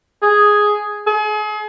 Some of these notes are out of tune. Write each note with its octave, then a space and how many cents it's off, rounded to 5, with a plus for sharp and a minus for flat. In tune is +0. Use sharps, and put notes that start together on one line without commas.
G#4 +0
G#4 +35